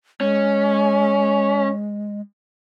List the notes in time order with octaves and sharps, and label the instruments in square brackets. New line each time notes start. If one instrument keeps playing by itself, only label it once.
[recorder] G#3 [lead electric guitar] C#4